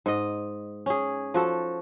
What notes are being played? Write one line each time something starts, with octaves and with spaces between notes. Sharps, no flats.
G#2 D#5
C#4 G#4
F3 F#4 A4